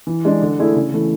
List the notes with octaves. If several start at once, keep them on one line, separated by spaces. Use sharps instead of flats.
E3
G#3 D4
D3
A3 E4 G#4 D5
C#3
E3 A3 E4